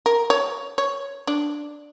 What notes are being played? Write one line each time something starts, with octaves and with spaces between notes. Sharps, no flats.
A#4
C#5
C#5
D4